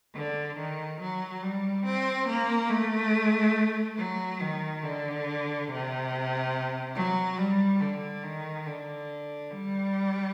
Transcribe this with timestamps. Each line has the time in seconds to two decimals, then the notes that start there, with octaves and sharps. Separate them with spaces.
0.14 D3
0.57 D#3
1.00 F#3
1.42 G3
1.85 C4
2.28 A#3
2.70 A3
3.97 F#3
4.40 D#3
4.83 D3
5.68 C3
6.95 F#3
7.38 G3
7.81 D3
8.23 D#3
8.66 D3
9.51 G3